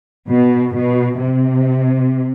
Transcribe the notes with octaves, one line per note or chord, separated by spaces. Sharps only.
B2
B2
C3